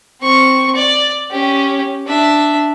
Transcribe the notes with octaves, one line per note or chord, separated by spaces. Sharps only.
C4 C#6
D5
C#4 G4
D4 E5